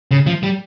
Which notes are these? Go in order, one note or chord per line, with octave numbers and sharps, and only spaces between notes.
C#3
F3
G3